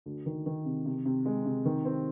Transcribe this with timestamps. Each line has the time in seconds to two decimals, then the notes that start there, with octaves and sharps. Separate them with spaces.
0.06 D2
0.26 D#3
0.46 D#3
0.65 C3
0.86 C3
1.05 C3
1.25 G#3
1.45 C3
1.65 D#3
1.85 C4